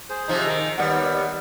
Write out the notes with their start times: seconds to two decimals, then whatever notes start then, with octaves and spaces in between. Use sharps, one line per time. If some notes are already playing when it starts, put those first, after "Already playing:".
0.09 G#4 C5
0.28 C3 F3 D#4
0.47 D#3
0.78 D#2 G3 B3 F#5